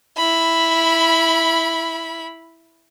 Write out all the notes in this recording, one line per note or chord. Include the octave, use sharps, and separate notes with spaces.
E4 B5